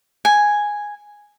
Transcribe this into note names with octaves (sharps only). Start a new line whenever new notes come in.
G#5